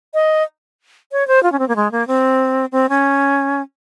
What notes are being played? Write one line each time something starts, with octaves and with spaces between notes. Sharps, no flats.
D#5
C#5
C5
F4
C#4
C4
A#3
G#3
A#3
C4
C4
C#4